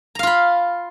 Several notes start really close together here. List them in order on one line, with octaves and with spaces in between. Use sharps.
A#5 F5 F4 B5